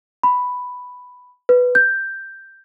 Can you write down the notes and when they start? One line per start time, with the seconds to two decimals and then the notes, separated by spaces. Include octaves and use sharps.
0.23 B5
1.49 B4
1.75 G6